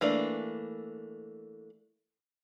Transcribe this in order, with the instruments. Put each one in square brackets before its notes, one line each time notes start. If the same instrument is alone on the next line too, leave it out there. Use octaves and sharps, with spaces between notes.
[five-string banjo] E3 A3 A#3 D4